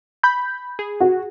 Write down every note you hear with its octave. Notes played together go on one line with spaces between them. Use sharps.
B5 G6
G#4
F#4